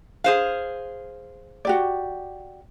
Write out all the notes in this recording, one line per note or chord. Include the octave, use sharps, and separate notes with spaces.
G#4 C5 F5
F#4 G4 D5